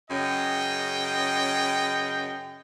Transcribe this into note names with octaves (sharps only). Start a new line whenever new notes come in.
F#2 C#3 D#5 G5